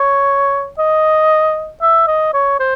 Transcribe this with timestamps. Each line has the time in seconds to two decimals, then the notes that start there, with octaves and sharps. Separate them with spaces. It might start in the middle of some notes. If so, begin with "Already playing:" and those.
Already playing: C#5
0.79 D#5
1.82 E5
2.07 D#5
2.33 C#5
2.59 C5